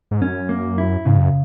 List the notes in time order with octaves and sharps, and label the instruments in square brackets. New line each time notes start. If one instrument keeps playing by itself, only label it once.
[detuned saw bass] G#2
[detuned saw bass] F#2 [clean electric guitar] C#4
[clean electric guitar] A#3
E4
[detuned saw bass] G#2 [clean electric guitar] C#3
[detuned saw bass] F#2